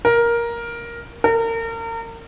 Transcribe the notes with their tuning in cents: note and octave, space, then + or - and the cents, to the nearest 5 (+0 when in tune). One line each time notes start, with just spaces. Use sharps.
A#4 +10
A#4 -35